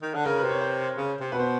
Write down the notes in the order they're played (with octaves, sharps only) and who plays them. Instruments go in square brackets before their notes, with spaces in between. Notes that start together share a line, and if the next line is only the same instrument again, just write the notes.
[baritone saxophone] D#3
D3
[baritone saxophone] C#3 [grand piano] A#4
[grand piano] B4
[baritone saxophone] C3
[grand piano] C#5
C5
[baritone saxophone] C#3
C3
[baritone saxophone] B2 [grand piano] B4
[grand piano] C5